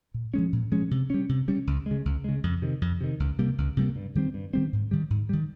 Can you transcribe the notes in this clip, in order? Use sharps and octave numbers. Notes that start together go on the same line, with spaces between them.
A#2
F3 G#3 C#4
A#2
F3 G#3 C#4
C3
G3 C#4
C3
G3 C#4
C#2
C#3 G#3
C#2
C#3 G#3
F2
C3 D#3
F2
C3 D#3
C#2
C3 G3 A#3
C#2
C3 G3 A#3
G2
D#3 G3 C4
G2
D#3 G3 C4
G#2
D#3 G3
G#2
D#3 G3